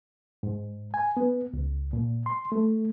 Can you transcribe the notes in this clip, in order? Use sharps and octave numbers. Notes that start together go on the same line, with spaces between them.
G#2
G#5
B3
C#2
A#2
C6
A3